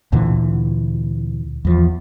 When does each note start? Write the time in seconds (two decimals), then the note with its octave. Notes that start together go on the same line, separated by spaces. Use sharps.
0.12 D2 A#2 D3 E3
1.65 E2 F3